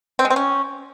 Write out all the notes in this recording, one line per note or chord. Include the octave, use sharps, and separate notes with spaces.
C4
G#3
C4
C#4